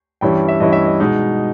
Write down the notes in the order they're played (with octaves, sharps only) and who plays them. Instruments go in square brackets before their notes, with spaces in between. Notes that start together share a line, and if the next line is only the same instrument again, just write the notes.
[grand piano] G2 E3 G3 C#4 E4 G5
G5
E5
G2 E3 G3 C#4 E4 D#5
E5
D#5
B2 G#3 D#4